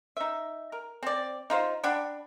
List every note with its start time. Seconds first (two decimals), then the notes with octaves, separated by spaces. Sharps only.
0.17 D#4 E5
0.72 A#4
1.03 C4 D5
1.50 D#4 F4 C5
1.83 D4 F#5 G5 B5